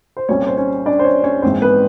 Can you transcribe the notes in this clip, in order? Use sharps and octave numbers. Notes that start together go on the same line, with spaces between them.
C5
C2 A#2 G3 C#4 C#5
C5
C#4 C#5
D4 D5
C5
C#4 C#5
C#4 C#5
A#1 G#2 E3 C4 C5
B3 B4